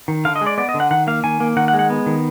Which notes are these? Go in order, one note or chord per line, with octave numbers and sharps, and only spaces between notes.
D#3
D3 F5
D#5
G#3
D5
B3 D5
D#5
D3
F#5
D#3 F#5
A#3 F5
D#3 G#5
A#3
D#3 F#5
F#5
G#3
F#5
B3
D#3